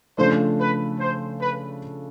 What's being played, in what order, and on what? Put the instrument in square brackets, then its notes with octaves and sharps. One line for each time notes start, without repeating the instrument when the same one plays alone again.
[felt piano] C#3 F3 A3 D4 [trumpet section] C5
[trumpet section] B4
C5
B4